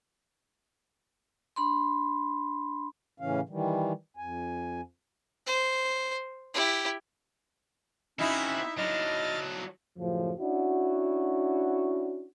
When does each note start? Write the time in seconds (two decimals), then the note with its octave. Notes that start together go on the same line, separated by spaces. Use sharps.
1.56 D4 B5 C6
3.20 A2 C#3 E3 C#4 F5
3.49 D#3 E3 G3
4.17 F2 G#5
5.47 C5
6.54 E4 G4
8.19 C4 C#4 D#4 E4 F#4 E5
8.78 F#3 D4 D#5 F6 A6
9.98 F#2 A2 C#3 F3
10.40 C#4 D4 E4 F#4